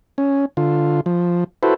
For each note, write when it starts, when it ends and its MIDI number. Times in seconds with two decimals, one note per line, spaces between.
0.18 0.45 61
0.57 1.01 50
0.57 1.01 65
1.06 1.44 53
1.63 1.74 64
1.63 1.74 66
1.63 1.74 69
1.63 1.74 71
1.63 1.74 72